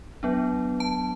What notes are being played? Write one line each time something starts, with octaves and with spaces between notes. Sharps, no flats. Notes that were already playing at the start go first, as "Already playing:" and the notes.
F#3 B3 D4
A5